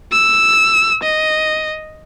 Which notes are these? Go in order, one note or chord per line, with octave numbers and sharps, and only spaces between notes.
E6
D#5